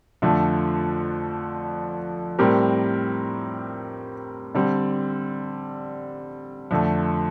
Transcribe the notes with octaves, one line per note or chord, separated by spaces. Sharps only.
F2 D3 F3 A3 D4
A2 G3 C4 G4 A#4
D3 G3 C4
F2 D3 A3